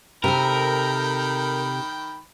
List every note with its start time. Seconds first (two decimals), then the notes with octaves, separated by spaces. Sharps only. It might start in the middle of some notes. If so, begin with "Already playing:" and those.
0.24 C3 D#3 A4 A#4 G5 B5